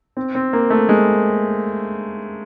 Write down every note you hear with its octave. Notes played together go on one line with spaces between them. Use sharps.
C4
C4
A#3
A3
G#3